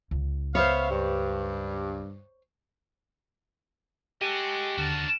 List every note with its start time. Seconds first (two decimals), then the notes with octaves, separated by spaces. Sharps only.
0.11 C#2
0.55 B3 C5 C#5 E5 F5
0.90 G2
4.21 F#4 G4 A4 D#5 G#5
4.77 D#2 D3 D4 F#4 A#4 A5